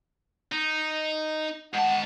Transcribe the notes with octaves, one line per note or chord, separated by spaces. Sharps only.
D#4
G#2 F#5 A5